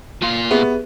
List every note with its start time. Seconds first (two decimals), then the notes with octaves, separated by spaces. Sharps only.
0.22 A#2 F4
0.51 B3 G4 G#4 E5